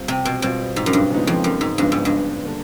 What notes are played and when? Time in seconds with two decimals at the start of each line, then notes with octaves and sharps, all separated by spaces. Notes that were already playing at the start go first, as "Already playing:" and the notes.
Already playing: G3 C4 F4
0.08 C3
0.25 B2
0.42 B2 G3 C4 F4
0.76 G#2
0.86 F#2
0.93 G2
1.10 C#3 F3 G#3 B3 D#4
1.27 F2
1.44 F#2
1.61 G#2
1.78 G2 C#3 F3 G#3 B3 D#4
1.92 G#2
2.05 G2
2.45 D3 G3 A#3 D4